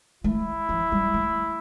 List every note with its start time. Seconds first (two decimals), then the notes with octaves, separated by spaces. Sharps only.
0.24 A3 E4
0.69 F3
0.92 G3
1.14 A3